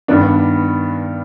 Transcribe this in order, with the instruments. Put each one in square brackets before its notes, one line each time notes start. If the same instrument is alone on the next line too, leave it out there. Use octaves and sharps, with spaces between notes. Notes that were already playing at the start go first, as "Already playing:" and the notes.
[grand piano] G2 D#3 B3 D4